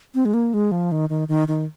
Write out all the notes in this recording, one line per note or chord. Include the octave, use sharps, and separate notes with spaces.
C4
G#3
A#3
G#3
F3
D#3
D#3
D#3
D#3